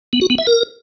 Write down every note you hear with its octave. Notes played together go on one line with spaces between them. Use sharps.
B3
F#4
B3
E5
A#4